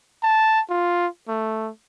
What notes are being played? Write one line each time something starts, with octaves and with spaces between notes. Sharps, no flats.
A5
F4
A3